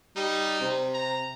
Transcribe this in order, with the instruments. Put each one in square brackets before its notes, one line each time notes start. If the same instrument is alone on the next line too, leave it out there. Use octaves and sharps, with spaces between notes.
[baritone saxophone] G3 [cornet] D#4
[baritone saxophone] C3
[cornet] A#5